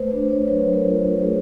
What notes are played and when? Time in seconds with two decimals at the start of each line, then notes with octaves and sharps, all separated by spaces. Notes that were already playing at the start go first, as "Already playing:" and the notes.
Already playing: A3 B4 C5
0.11 D4 C5
0.30 C#5
0.48 F#3 B4
0.73 A#4
0.85 F4
1.21 A3 G#4